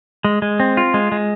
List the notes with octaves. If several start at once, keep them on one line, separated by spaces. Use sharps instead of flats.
G#3
G#3
C4
F4
G#3
G#3